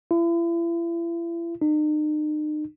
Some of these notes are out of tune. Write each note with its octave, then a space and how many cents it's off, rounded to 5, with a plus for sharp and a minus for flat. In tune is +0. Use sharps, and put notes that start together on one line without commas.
E4 +40
D#4 -40